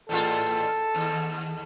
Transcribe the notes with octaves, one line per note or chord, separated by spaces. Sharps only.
E2 A2 F4 A4
D#2